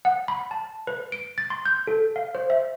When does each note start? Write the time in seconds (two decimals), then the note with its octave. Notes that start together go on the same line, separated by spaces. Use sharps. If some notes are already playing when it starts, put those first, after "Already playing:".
0.05 F#5
0.28 B5
0.51 A5
0.87 B4
1.12 D7
1.38 A6
1.50 C6
1.66 G6
1.87 A4
2.16 F5
2.35 C5
2.50 E5